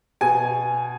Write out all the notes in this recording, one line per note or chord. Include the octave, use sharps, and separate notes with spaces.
B2 G#5